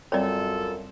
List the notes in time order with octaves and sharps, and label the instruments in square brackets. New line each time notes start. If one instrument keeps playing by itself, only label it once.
[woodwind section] F#2 [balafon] G3 C4 G5 [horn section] F4 A4 [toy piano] C#5 D5